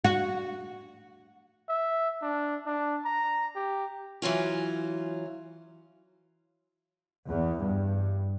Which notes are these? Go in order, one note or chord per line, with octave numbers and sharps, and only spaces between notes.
F#4
E5
D4
D4
A#5
G4
E3 F#3 C#4 F4
E2
G2